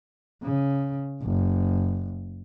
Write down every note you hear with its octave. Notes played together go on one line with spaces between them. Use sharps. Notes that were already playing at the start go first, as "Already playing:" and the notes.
C#3
F#1